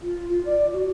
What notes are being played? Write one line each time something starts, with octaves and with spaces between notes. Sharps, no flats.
F4
F4
D5
F#4